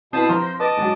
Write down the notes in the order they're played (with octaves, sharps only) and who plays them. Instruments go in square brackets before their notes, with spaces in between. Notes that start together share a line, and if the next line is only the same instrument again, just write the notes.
[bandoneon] B2 A5 D#6 [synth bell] C4 E4 B4
[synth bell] F3 [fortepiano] C4 A#5 C6
[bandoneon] C5 [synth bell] A#6
[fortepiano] B4 [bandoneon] D#5 A5 [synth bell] D6 A6 D7
[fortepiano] G#2 F#3